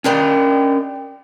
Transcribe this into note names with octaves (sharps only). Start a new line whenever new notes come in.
C#4 D4 G4 A#4 D#5 G5